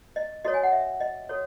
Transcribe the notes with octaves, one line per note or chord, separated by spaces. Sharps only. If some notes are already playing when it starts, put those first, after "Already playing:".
D#5
F#4 A4 C#5 D#5
G#5
F#5
E5
D#5
F#4 A4 C#5